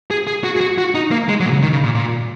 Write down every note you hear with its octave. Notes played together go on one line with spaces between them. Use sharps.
G#4
G#4
F#4
G#4
F#4
F#4
D#4
A#3
G#3
F#3
A#2
C#3
D#3
C#3
A#2
A#2